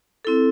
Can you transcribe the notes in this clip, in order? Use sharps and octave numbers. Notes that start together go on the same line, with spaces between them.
C4 E4 A4